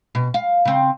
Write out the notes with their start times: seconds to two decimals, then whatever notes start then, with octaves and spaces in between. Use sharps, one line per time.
0.15 B2
0.34 F5
0.65 C#3 C4